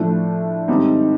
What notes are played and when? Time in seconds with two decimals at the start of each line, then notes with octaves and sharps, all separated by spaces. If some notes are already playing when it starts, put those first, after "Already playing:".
Already playing: A2 F3 A3 D4
0.68 G#2 D#3 G3 C4 D#4